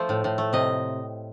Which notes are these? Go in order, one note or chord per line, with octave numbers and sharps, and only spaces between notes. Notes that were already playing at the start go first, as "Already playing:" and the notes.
Already playing: F3 A3 C5
A2
A2
A3
C3 D#5